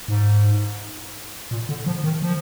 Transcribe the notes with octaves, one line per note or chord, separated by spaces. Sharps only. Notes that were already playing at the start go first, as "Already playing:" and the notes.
G#2
A#2
D3
F3
D#3
F3